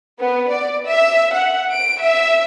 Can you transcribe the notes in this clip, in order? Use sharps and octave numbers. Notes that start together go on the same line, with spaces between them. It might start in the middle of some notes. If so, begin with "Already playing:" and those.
B3
D5
E5
F#5
D7
E5